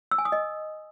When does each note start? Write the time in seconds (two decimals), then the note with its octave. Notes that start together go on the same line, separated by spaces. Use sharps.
0.11 E6
0.18 G#5
0.25 D#6
0.32 D#5